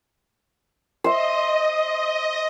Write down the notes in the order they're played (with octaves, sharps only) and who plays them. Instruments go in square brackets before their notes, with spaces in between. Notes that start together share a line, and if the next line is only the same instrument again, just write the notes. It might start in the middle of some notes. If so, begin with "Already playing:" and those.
[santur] C5 E5 [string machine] D#5